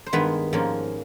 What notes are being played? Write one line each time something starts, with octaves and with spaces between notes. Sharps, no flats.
C5
G2 D#3 G#3 B3 B4
G#2 F3 A#3 C#4